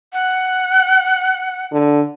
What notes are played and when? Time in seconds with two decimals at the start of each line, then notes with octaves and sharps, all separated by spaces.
0.13 F#5
1.72 D3